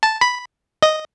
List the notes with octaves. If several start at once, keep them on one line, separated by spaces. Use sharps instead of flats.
A5
B5
D#5